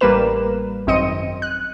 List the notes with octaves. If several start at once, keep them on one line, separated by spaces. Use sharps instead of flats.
A1 G3 A#3 A#4 B4 E7
G#1 F#2 C4 D#5 C#7 D#7
F#6